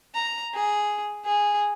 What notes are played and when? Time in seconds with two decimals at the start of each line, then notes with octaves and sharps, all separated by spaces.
0.14 A#5
0.54 G#4
1.25 G#4